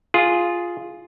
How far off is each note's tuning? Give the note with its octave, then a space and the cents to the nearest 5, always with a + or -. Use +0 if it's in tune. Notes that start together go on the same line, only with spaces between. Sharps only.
F4 +0 G#4 +0